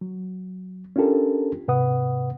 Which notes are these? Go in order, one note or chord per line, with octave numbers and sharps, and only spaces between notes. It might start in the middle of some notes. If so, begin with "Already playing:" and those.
F#3
C#4 D4 F4 G4 A4 A#4
G#2 C3 B4 F#5 D#6